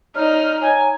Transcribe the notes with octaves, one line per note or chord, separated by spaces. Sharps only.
D#4 C#5 D5 F6
C#5 G#5 A#5